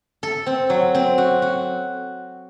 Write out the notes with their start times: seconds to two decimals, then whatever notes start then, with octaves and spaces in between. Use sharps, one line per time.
0.23 A4
0.46 C4
0.70 F#3
0.94 C4
1.18 F#4
1.42 F#4